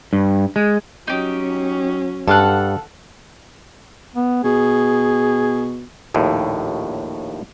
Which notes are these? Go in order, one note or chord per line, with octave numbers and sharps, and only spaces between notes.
G2
G#3
F#3 C#4 D#4 G4
G2 A4 F5 F#5
B3
B2 G#4
A#1 D#2 A2